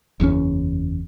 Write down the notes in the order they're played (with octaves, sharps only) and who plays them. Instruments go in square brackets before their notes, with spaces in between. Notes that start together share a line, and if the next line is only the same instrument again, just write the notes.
[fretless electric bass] F#1 E2 A#2 C#4